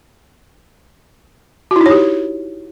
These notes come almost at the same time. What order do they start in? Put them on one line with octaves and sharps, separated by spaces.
F#4 E4 D#4 C#5 G4